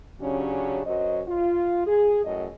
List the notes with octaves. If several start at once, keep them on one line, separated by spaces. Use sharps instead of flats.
C#3 F#3 C#4 D4 G4
F#2 F#3 C5 D#5
F4
G#4
F#2 A2 D#5